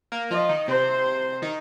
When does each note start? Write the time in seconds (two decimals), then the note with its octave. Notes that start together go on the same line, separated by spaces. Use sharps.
0.12 A#3 A#4
0.30 F3 F4 D#5
0.49 D#3 D#4
0.68 C3 C4 C5
1.42 D#3 D#4